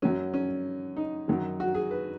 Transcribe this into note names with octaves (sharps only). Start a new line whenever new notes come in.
F#2 F#3 C#4
C#4
D#4
F#2 D#3 F#3
F#4
G#4
B4